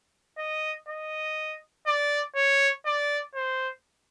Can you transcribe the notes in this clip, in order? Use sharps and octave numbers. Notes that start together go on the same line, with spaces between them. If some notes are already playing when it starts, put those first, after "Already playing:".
D#5
D#5
D5
C#5
D5
C5